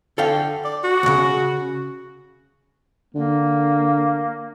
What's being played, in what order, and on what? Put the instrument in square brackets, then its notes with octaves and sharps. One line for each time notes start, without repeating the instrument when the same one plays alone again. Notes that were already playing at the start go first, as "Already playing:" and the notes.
[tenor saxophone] D3 [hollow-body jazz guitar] A4 F5 G5
[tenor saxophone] D5
F#4
[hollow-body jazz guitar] D2 C#3
[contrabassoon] D3 [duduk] A#3